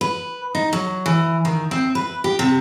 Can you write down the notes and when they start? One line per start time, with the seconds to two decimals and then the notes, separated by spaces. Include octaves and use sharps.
0.01 B4
0.55 D#4
0.73 F#3
1.06 E3
1.45 D#3
1.71 C4
1.95 B4
2.24 G4
2.39 C3